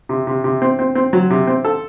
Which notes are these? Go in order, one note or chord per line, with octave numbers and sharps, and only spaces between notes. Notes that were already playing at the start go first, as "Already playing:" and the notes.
C3
C3
C3
C4
C4
C4
F#3
C3
C4
A4